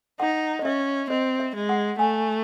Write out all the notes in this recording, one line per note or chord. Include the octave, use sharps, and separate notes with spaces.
D#4 F#5
D#5
C#4 E5
C4 D#5
E5
G#3
F#5
A3 G#5